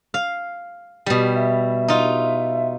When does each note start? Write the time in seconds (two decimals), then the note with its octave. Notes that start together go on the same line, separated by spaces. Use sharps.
0.14 F5
1.06 B2 G3 G4
1.36 E5
1.88 D#4 F4